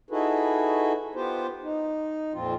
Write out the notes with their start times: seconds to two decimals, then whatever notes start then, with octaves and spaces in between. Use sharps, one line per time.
0.10 D#4 E4 F#4 G#4 A4 B4
1.15 B3 F4 G4 C5
1.62 D#4
2.33 F2 A#2 F3 C4 F4